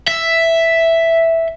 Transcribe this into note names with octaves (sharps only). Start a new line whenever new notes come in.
E5